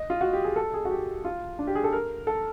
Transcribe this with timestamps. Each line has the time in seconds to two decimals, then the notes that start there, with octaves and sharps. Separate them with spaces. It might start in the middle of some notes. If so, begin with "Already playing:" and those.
Already playing: D#5
0.10 F4
0.21 F#4
0.33 G4
0.44 G#4
0.56 A4
0.74 G#4
0.85 F#4
0.91 G4
1.25 F4
1.59 D4
1.67 G4
1.75 G#4
1.84 A4
1.93 A#4
2.27 A4